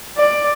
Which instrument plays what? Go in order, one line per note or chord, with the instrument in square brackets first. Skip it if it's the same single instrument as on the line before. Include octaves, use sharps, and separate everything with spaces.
[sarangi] D5